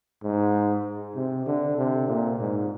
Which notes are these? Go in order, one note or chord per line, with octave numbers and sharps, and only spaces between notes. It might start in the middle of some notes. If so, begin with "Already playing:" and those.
G#2
C3
D3
C3
A#2
G#2